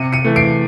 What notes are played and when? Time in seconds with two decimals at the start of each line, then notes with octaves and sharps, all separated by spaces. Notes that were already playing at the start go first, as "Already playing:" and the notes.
Already playing: C3 C#7 D#7
0.13 C#7 D#7
0.25 E3 A3
0.36 C7 D7